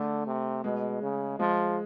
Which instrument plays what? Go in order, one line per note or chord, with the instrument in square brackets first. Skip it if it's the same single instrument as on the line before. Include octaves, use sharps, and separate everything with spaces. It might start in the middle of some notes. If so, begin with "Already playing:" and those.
Already playing: [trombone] D3 [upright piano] A3
[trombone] C3
[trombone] B2 [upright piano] G#3
[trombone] C#3
[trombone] F3 [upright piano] G#3